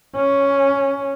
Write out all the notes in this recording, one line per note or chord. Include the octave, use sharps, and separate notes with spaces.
C#4